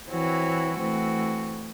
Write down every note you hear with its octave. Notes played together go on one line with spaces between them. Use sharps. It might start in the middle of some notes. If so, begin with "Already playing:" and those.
E3 C4 F#4 C#5
E3 A3 C4 F#4